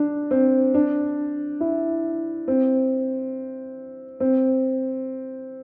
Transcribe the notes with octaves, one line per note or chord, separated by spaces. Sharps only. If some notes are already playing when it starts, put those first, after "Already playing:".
Already playing: D4
C4
D4
E4
C4
C4